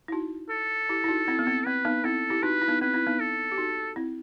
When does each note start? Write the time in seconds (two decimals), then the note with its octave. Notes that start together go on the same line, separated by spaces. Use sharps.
0.08 E4
0.12 D#4 F#4
0.50 A4
0.89 E4 G4
1.04 E4
1.08 D#4 F#4
1.28 C4 E4
1.39 B3
1.47 C4
1.66 C4 B4
1.85 B3 D#4
2.04 C4 E4 A4
2.30 E4 G4
2.42 D#4 F#4 B4
2.62 E4
2.68 B3 D#4
2.81 C4 B4
2.94 C4 E4
3.07 B3 D#4
3.20 A4
3.52 G4
3.58 D#4 F#4
3.96 C4 E4